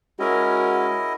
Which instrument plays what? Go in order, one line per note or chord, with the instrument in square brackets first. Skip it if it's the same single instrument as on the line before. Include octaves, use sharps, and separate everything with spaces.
[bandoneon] G#3 C#4 [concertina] E4 D#5 [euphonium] F#4 [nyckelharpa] A#4